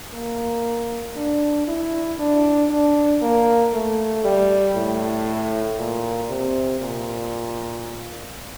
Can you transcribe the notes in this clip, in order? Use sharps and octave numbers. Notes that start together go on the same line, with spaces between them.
A#3
D4
E4
D4
D4
A#3
A3
G3
A2
A#2
C3
A#2